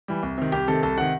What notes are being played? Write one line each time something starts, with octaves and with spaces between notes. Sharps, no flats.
E3 G3
C2
C3 D#3
C2 G4
C3 D#3 A4
C2 A4
C3 D#3 F#5